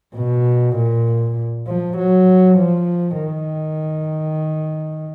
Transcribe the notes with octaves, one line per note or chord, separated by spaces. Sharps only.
B2
A#2
F3
F#3
F3
D#3